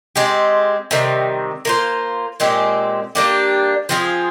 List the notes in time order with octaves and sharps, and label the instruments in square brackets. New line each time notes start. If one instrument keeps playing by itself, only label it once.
[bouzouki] G#3 C4 G4
C3 D#3 G3
A#3 F4 C5
A#2 G#3 C4 G4
G3 A#3 D4 G4
F3 C4 F4 G#4